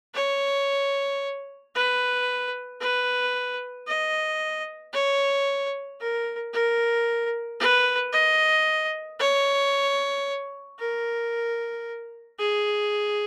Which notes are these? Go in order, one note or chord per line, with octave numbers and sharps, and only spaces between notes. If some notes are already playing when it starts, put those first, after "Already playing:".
C#5
B4
B4
D#5
C#5
A#4
A#4
B4
D#5
C#5
A#4
G#4